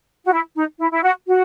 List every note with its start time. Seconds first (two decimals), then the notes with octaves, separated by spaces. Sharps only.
0.25 F#4
0.32 E4
0.56 D#4
0.79 E4
0.91 E4
1.03 F#4
1.26 F#4